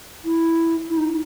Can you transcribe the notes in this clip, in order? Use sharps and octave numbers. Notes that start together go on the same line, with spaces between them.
E4
E4
D#4